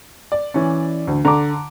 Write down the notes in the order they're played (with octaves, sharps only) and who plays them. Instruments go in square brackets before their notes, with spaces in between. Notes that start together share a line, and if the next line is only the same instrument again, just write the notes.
[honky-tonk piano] D5
[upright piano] E3 C#4
D2
[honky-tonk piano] D3 [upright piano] A#5 D6